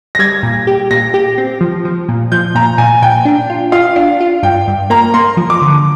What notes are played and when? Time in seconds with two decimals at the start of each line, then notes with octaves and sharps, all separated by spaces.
0.15 A#6
0.19 G3 G#6
0.43 A#2
0.67 G4
0.91 A#2 A#6
1.14 G4
1.38 C4
1.61 F3
1.85 F3
2.09 A#2
2.32 F3 G6
2.55 A#2 A#5
2.78 A#2 G#5
3.02 A#2 G5
3.25 D4
3.50 F4
3.72 F4 F5
3.96 D4
4.20 F4
4.43 G2 G5
4.68 G2
4.90 A#3 A#5
5.14 A#3 C6
5.37 F3
5.50 D6
5.62 D3